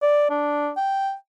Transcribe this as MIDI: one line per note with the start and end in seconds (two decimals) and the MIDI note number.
0.02 0.25 74
0.30 0.70 62
0.77 1.14 79